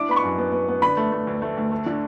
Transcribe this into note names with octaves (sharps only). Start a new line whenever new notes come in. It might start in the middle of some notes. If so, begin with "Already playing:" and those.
Already playing: D4 E4 D6
B3 B5
C#6
F#2
B3
B3
B3
D3 B5
A3
A3
D2
A3
D2
A3
D3